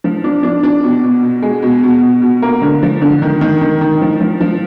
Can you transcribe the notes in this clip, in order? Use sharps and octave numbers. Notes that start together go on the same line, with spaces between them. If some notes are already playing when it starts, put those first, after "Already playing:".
F3
D4
D4
D4
B2
B2
B2
G#3
B2
B2
B2
B2
A#3
D3
F3
D3
D#3
D#3
D#3
D#3
F3
F3
F3